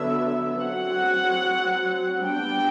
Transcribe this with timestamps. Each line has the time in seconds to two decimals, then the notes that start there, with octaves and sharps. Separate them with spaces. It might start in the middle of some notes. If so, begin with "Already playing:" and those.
Already playing: D3 F#3 B3 E5
0.63 F#3 C4 F#5
2.25 G3 B3 D4 G5